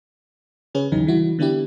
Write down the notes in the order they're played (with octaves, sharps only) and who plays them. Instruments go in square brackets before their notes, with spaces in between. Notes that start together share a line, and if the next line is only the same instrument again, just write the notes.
[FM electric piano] C#3 C#4 G#4 B4 C#5
A1 D#2 C#3 E3 F#3 D#4
E3 G3 E4 F#4
D3 B3 D4 E4 G4